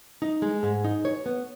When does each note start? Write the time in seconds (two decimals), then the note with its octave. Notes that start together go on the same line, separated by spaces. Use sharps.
0.22 D#4
0.42 G#3
0.63 G#2
0.84 D#4
1.05 C#5
1.26 B3